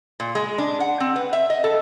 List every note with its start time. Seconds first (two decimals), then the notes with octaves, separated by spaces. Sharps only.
0.20 A#2
0.35 G#3
0.58 D4
0.80 F#5
1.00 C4
1.16 B4
1.33 E5
1.50 D#5
1.64 A4